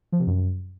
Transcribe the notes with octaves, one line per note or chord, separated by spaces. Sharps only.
F3
C3
F#2